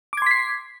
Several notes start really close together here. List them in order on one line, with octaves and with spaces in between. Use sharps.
D6 G#6 C6 B6 C7